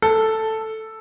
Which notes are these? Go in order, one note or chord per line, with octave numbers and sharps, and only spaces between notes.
A4